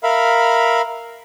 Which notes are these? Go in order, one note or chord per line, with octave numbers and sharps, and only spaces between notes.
A#4 E5 F5 B5